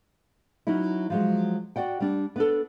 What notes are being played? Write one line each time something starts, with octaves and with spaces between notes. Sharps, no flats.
F#3 C#4 D#4 E4
F3 F#3 G#3
F#4 D5 F#5 G5
G3 D4
B3 D4 A4